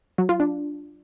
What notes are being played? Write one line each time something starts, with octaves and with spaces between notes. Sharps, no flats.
F#3
F4
D4